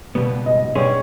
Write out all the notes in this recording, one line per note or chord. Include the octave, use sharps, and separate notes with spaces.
C#2 B2 G3 B3
D#5
B2 G3 C#4 G#4 C#5